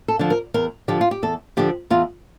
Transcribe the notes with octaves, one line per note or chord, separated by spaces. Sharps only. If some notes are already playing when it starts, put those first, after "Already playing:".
A4
D3 F3
A#4
E2 A#4
D3 F3 G4
F4
G4
E2 A4
D3 F3 G4
E2 F4